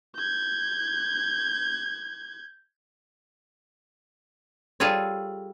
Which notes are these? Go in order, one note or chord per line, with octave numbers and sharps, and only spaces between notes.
G6 G#6
G3 F4 G#4 A4 C#5